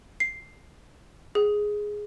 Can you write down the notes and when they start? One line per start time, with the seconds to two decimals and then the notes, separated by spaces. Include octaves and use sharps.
0.20 C7
1.35 G#4